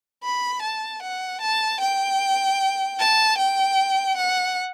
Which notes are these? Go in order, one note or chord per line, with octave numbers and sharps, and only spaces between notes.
B5
A5
F#5
A5
G5
A5
G5
F#5